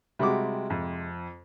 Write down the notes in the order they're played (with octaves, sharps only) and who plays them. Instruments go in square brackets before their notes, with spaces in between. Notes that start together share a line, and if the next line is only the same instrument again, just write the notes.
[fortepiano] C3 G#3 D6 [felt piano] G3 F#4
[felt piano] F2